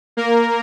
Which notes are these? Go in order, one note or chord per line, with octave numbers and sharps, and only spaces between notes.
A#3 A#4